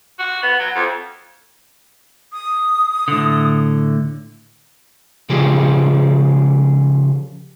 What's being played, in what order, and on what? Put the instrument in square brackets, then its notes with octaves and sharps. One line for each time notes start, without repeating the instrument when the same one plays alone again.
[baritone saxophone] F#4
B3
F#3
F2
[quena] D#6
[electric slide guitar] A2 D3
C#3 F3 G4 G#4